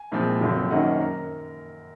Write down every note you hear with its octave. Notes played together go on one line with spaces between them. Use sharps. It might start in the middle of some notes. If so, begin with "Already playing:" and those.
Already playing: G#5
C2 A#2 F3 G#3 C4
F#1 F2 C3 F#3 C4
F#2 D#3 A#3 C#4 D#5 F#5
C5
A#4